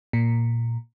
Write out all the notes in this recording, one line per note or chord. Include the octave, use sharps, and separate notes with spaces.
A#2